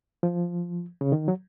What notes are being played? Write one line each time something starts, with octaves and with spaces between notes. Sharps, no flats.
F3
C#3
D#3
F#3